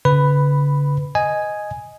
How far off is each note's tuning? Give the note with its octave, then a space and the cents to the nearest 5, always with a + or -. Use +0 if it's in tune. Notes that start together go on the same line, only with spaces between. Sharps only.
D3 -45 B4 +10 B5 +0
D#5 +0 G#5 +0